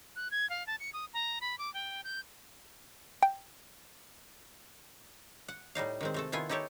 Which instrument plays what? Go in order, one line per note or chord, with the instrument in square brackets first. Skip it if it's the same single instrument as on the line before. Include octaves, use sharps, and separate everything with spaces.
[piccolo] F#6
G#6
F5
A5
C#7
D#6
A#5
B5
D6
G5
G6
[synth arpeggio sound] G5
[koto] F#5
A2 G3 D#4 F5
D#3 G#3 C4
C3 A3 A4
D#3 B3 E4 F4 G#5
D#4 E4 G4 A4 C#5